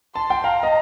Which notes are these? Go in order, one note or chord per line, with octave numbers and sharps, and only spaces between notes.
A5 C6
G5
F5 A#5
D#5